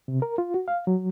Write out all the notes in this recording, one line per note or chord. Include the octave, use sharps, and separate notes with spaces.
C3
A#4
F4
F#4
F5
F#3